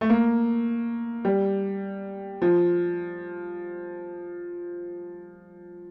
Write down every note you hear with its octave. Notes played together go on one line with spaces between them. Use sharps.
A3
A#3
G3
F3